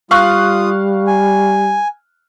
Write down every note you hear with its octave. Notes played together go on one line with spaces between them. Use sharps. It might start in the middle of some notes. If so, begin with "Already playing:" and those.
G3 F4 F5 C#6 D#6 F#6
G#5